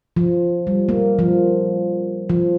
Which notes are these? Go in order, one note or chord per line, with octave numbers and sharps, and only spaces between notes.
F3
G3
A#3
F3
F3